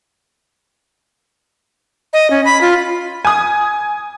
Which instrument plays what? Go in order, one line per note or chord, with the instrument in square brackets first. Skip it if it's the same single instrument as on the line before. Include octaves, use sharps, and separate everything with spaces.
[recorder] D#5
C#4
B5
F4
[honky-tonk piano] G#5 D#6